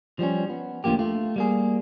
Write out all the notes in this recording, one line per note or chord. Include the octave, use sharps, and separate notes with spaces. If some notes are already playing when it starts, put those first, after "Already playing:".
F3 G3 B3 C#4
B3
D2 D3 F3 A#3 G4
A3 F4
G3 A#3 G#4